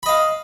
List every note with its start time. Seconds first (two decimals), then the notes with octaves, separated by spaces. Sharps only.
0.03 B5
0.06 D#5
0.09 F5